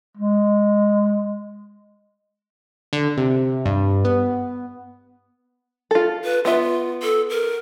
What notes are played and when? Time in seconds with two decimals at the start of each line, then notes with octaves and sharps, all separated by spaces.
0.17 G#3
2.93 D3
3.17 C3
3.65 G2
4.05 B3
5.91 F4 A4
6.24 B4
6.45 B3 F4 E5
7.03 A4
7.30 A#4